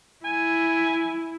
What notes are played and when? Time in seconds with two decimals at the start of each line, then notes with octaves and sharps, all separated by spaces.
0.25 E4 G#5